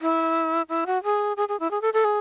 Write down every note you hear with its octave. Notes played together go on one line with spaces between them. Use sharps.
E4
E4
F#4
G#4
G#4
G#4
E4
G#4
A4
A4
G#4